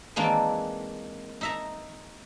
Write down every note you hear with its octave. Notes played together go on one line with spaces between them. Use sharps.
D#3 E3 G#3 A#3 C4 D4
D#4 E5 A#5